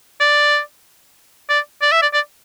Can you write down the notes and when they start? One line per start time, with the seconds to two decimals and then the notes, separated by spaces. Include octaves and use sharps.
0.20 D5
1.49 D5
1.82 D5
1.92 E5
2.02 D5
2.14 D5